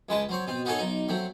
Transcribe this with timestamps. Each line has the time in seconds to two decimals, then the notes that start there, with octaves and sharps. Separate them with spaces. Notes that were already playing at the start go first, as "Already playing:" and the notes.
0.09 C#2 G#3 B4 A5
0.29 F#3 C4 C#5
0.47 B2 C4
0.65 B3 D#4 F#4 G#4 A4 C#5
0.79 B1 D#4
1.08 F#3 A3 C4